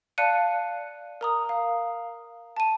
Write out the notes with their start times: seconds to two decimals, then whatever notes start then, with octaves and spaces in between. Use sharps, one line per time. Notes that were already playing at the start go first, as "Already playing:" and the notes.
0.18 D5 F5 A5 F#6 C#7 D#7
1.21 A#4 A#5 D#6
1.49 F5
2.57 A5 D#7